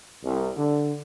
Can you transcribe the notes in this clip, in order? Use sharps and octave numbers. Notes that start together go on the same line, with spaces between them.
C2
D3